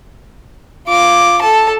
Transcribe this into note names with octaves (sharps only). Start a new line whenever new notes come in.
F4 D6
A4 A5